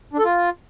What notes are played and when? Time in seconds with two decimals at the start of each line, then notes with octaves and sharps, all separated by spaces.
0.13 D4
0.19 A4
0.24 F4